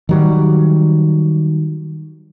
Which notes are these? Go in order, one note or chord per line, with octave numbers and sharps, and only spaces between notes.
D#3 F#3 G3